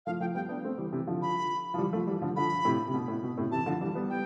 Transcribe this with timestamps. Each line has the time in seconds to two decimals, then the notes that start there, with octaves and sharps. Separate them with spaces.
0.06 F3 A3 F5
0.20 F3 A3 G5
0.34 G3 B3 G5
0.49 B3 D4
0.64 A3 C4
0.78 E3 G3
0.93 C3 E3
1.07 D3 F3
1.22 B5
1.74 F3
1.78 E3 G3
1.93 F3 A3
2.07 E3 G3
2.22 D3 F3
2.36 D3 F3 B5
2.65 A2 C3
2.88 C3
2.94 B2
3.08 A2
3.23 B2
3.38 A2 C3
3.51 C3 E3 A5
3.66 D3 F3
3.81 E3 G3
3.95 G3 B3
4.10 G5